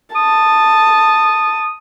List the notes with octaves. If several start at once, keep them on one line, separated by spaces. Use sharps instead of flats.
A5 D#6